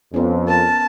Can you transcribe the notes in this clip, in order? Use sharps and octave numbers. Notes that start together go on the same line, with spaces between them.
F2 B3 C#4
A#4 A5